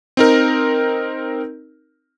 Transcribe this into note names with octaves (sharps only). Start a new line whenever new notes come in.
C4 D#4 A#4